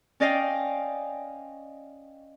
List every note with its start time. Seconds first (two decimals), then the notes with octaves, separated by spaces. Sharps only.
0.20 C#4 D5 D#5 F5 G5